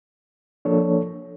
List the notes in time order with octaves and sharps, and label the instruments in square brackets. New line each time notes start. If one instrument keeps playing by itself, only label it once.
[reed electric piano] F3 A#3 D4 A4 C#5